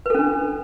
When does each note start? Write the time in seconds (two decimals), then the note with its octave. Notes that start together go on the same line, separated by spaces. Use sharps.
0.06 B4
0.10 A4
0.14 C#4
0.19 D4